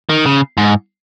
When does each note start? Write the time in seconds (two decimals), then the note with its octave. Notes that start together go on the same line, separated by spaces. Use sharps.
0.09 D#3
0.26 C#3
0.57 G#2